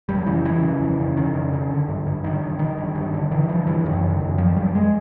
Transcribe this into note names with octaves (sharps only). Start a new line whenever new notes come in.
F2 G3
C#3 E3
C#3 E3
C#3
F2
C#3
F2 D#3
C#3
C#3
D3
G2
G2
D3 D#3
G2
D3 D#3
G2
G2
D3
D3 E3
G2 F3
G2 E3
F#2 D#3
C#3
F#2
F#2 F3
F#2 G3
G#3